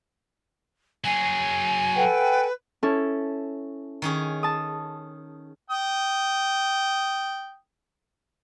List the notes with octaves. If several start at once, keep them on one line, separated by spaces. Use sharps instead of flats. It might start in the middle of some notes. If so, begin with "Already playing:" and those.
F#3 G#4 G#5
A4 B4 F#5 G5
C#4 E4 A4
D#3 C#4 G#4
A5 D#6
G5 D#6